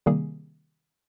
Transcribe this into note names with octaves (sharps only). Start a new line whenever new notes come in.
C3 D#3 G3 A#3 G#4